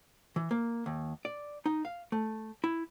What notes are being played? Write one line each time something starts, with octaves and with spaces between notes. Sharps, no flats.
E3
A#3
D#2
D5
D#4
F5
A3
E4